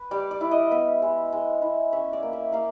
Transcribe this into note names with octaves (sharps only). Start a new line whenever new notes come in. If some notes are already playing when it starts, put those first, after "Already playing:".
Already playing: B4
G3 D5
D5
E4
D#5
B3 E5
G#3
G#3
E4
C#4 E5
D5
A#3
E5
A#3 F5